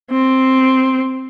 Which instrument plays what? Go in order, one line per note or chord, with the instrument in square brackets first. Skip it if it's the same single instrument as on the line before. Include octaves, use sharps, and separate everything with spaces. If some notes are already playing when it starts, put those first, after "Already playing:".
[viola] C4